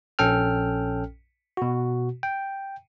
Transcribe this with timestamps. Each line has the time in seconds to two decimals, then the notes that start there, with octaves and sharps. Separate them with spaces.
0.19 A#1 C#4 A4 G5 F6
1.57 B2 F#4
2.23 G5